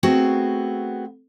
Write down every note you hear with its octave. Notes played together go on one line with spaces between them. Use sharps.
A3 B3 C4 F#4 G#4